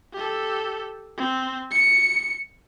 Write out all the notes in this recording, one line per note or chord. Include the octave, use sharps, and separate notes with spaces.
G4 A4
C4
C#7